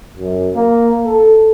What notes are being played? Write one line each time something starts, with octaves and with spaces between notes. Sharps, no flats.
F#2
A#3
A4